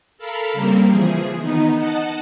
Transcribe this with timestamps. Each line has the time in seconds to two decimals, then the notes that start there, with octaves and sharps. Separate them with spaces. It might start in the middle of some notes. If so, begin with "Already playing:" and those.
0.18 A4 A#4 F5 B5 F6
0.53 C#3 G3 A#3 C4
0.90 E3 F3 G#4
1.38 D#3 B3 D#4
1.76 D#5 F#5 A5